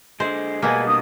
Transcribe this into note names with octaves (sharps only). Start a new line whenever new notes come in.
D3 G#3 C5
B2 G3 G#3 A#3 G#5
G2 C3 D#6